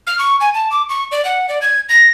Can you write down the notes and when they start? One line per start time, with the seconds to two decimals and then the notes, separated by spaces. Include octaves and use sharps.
0.07 F6
0.19 C#6
0.41 G#5
0.54 A5
0.71 D6
0.89 C#6
1.12 D5
1.25 F#5
1.49 D5
1.62 G#6
1.89 A#6